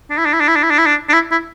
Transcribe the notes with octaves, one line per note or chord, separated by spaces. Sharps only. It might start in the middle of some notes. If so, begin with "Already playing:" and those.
D4
E4
D4
E4
D4
E4
D4
E4
D4
E4
D4
D4
E4
E4